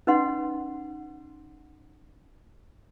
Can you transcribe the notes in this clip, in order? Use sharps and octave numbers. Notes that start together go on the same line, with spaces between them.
C#4 D#4 B4 D#5 F#5 C6